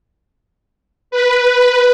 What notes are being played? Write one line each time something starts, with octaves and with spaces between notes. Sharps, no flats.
B4